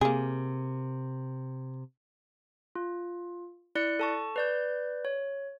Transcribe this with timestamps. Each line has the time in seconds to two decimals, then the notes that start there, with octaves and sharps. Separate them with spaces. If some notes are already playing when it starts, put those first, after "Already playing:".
0.01 C3 A#3 G#4
2.76 F4
3.75 E4 D5 F#6 C#7
3.99 A4 A5 C#6
4.36 B4 D5 G6
5.05 C#5